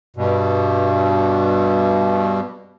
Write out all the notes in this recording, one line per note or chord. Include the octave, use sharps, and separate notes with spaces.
G2 B2